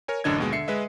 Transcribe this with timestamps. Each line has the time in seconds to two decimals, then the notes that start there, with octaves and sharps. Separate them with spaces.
0.08 A#4 C#5 G#5
0.24 A1 F#2 D3 D4 D#5 G#6
0.38 D#2 B2 G#3
0.52 D3 E5 C7 C#7
0.68 G#3 B4 D#5 E5